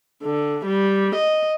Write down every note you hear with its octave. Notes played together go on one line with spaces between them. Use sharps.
D3
G3
D#5